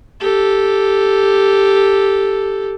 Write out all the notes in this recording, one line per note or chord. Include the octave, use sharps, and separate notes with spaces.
G4 A4